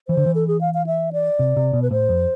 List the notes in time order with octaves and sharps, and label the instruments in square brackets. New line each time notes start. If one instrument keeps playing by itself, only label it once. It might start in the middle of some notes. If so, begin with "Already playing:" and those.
[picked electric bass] E3 [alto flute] C5
[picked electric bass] D3
E3
[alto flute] A4
G#4
F5
F5
E5
D5
[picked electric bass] C3
C3
B2
[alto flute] B4
[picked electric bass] A2 [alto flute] C5
[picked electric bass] F2